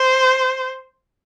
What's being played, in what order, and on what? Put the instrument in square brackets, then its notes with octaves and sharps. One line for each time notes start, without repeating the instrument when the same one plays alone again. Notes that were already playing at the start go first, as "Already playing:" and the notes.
Already playing: [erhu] C5